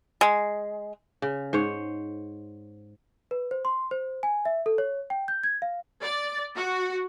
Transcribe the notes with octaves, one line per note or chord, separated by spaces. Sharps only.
G#3
C#3
G#2 C5 C#5
B4
C5
C6
C5
G#5
E5
A4
C#5
G5
G6
G#6
F5
D5
F#4